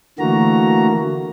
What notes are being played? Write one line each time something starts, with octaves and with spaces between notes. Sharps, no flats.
D3 E3 A3 A#3 F#4 A#5